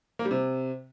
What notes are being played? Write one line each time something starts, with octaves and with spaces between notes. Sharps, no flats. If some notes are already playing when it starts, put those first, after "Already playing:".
A#3
G3
C3